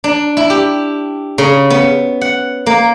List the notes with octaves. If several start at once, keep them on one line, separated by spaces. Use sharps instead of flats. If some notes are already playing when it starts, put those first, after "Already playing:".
D4
E4
G4
C#3
B3
F#5
A#3